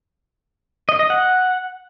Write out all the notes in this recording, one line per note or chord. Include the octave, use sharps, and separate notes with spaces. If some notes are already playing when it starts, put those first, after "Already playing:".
D#5
D#5
F#5